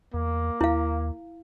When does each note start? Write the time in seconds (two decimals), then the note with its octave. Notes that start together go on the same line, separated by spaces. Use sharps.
0.14 E2 A#3
0.61 D#2 E4 F5